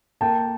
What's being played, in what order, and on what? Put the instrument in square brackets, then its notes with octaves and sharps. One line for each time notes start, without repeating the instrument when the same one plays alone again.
[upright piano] A#3 G5 A5